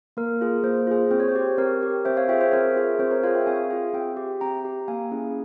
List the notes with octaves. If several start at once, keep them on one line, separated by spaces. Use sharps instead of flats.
A#3 A#4
F4 G#4
A#3 C5
F4 G#4
C4 C5
C#5
C5
G4
C4 A#4 C#5
G4
C4 C5 E5
C#5 F5
F4 G#4 E5 G5
C5 E5
C4 A#4 C#5
F4 G#4
C4 C5
A#4 C#5
F4 G#4 C#5 F5
E5 G5
C4 F5 G#5
F4 G#4
C4 E5 G5
G4
C4 G5 A#5
G4
A#3 F5 G#5
C#4 E4 G#4